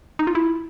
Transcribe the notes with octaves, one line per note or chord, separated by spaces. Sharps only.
D#4
F4
E4